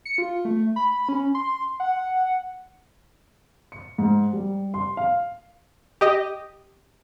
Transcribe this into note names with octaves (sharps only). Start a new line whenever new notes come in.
C#7
F4
A3
B5
C#4
C6
F#5
C#7
G#2
G3
C6
F5
G4 D#5